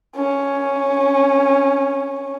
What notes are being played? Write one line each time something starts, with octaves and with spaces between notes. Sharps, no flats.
C#4